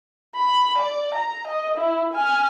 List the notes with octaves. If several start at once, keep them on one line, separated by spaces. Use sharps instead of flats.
B5
D5
A#5
D#5
E4
G#5 F6